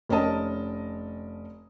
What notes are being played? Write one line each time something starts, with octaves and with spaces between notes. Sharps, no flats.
F1 C#4 A#4 D#5 A5 D#6